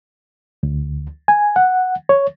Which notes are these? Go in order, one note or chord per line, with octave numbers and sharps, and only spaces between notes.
D2
G#5
F#5
C#5